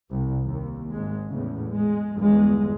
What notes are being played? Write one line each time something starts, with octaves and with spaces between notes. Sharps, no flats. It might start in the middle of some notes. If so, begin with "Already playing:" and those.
C2
D#2
G#1 G#2 G#3
E2 A2 C#3
G#3
G1 E2 G#3